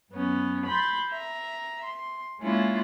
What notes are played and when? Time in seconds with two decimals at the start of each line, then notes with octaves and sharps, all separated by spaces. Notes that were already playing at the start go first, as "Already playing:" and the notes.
0.11 F#2 B3 C#4
0.66 B5 C6 G6 A6
1.10 E5 A#5
1.84 C6
2.40 G#3 A#3 C#4 D4 E4 F4